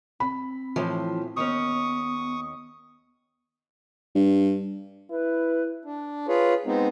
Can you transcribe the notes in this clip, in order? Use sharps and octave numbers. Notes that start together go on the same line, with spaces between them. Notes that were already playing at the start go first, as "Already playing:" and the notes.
C4 B5
A2 E3 F3
D#2 B3 C#4 C#6 D#6
G2
E4 B4
D4
F4 G#4 B4 C#5
G#3 B3 C4 D#4